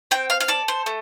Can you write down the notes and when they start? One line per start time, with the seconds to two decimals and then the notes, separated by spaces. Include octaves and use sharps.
0.11 C4 G5
0.30 F5
0.40 F5
0.48 A4 D5
0.68 C5
0.86 A3